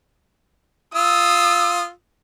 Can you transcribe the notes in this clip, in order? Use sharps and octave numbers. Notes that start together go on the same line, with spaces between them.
F4 D#6 E6